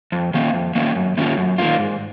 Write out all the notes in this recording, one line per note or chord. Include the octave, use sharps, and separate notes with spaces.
F2
D#3 A#3 C#4
F2
D#3 A#3 C#4
F#2
D#3 A#3 C#4 F4
F#2
D#3 A#3 C#4 F4
G#2